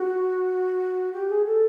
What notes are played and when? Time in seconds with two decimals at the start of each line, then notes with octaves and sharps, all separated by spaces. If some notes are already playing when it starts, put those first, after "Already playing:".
Already playing: F#4
1.13 G4
1.29 G#4
1.45 A4